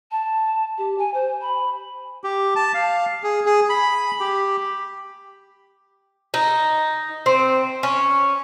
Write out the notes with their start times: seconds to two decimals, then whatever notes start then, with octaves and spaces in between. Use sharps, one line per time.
0.11 A5
0.78 G4
0.98 G#5
1.14 C5
1.41 B5
2.24 G4
2.56 A5
2.74 F5
3.23 G#4
3.46 G#4
3.70 B5
4.20 G4
6.34 D#4
7.26 C4
7.83 C#4